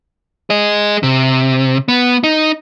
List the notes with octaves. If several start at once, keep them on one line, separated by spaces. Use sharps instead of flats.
G#4 D#5
C3
B3
D#4